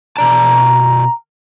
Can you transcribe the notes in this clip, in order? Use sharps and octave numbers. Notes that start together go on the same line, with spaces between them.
B2 D5 A5 A#5